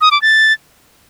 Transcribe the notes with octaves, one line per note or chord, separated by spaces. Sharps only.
D#6
D6
A6